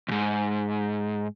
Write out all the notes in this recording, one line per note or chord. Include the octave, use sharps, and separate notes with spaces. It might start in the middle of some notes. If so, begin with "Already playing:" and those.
D2 G#2